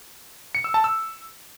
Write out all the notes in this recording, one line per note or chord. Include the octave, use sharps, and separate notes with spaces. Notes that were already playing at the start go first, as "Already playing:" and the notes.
C#7
E6
A5
E6